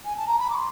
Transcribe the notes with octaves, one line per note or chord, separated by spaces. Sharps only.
G#5
A5
A#5
B5
D6
C6